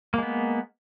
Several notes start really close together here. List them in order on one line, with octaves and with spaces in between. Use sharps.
A#3 G#3 B3